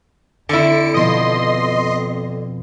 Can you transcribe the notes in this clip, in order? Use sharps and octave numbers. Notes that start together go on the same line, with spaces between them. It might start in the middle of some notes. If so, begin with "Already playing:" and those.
F2 D3 E4 C#7 D7
B2 F3 B3 D#5 C6